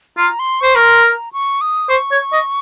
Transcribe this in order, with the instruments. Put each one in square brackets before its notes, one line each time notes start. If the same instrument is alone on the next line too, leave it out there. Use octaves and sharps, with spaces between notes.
[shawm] F4 [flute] A#5
[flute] C6
[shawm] C5 [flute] C#6
[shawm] A#4
[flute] C6
A#5
C#6
D#6
[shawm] C5 [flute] C#6
[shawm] C#5
D#5